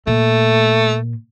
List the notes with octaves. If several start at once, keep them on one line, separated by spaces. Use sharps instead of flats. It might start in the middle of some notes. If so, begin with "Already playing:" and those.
A#2 A3